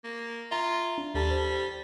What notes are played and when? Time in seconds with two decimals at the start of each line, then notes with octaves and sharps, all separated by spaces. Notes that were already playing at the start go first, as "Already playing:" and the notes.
0.04 A#3
0.51 F4 E5 A#5
0.98 D4
1.15 D#2 G3 A4 A5
1.31 C5